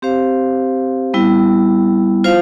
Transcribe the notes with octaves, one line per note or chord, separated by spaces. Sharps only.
C4 G4 C5 F5
G3 B3 E4
F4 C5 F5